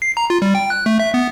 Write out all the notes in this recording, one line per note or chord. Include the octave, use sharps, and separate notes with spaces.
C7
A#5
F4
G3
G5
F#6
A3
E5
B3